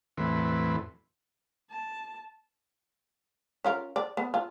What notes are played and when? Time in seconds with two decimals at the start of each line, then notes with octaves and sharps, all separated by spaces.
0.17 E2 A2 E3 F#3 C4 B4
1.71 A5
3.64 C#4 F4 A#4
3.96 D5
4.17 B3
4.34 F4